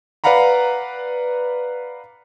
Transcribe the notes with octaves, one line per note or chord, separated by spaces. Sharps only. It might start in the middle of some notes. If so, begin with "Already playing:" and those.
B4 D5 F5 F#5 A#5 B5